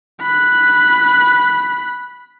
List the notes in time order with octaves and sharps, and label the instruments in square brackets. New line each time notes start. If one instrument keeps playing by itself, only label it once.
[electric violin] B5 F#6